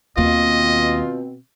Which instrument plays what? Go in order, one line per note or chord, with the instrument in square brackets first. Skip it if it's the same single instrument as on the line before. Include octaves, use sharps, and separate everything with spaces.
[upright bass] D#2 A#3 [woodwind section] B2 C4 [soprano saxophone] F4 [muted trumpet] D#5